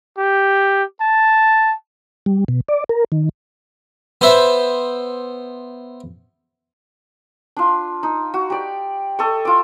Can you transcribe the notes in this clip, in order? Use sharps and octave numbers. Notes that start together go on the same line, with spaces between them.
G4
A5
G3
B2
D5
A#4
D#3
B3 C5 E5
D4 F4
D#4
F#4
G4 D5
A4 D#5 C#6
F4 D6